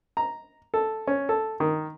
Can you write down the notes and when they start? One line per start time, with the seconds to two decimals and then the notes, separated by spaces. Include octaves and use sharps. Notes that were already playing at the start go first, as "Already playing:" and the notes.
0.17 A#5
0.74 A4
1.07 C#4
1.29 A4
1.60 D#3